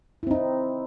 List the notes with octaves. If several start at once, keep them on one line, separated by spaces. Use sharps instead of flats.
C4 D#4 E4